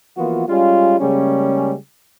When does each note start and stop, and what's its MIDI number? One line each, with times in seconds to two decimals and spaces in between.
0.18 0.44 52
0.18 0.44 53
0.18 0.44 58
0.18 0.44 59
0.18 0.44 65
0.18 0.44 66
0.48 0.98 55
0.48 0.98 56
0.48 0.98 61
0.48 0.98 65
1.00 1.74 49
1.00 1.74 55
1.00 1.74 56
1.00 1.74 58
1.00 1.74 61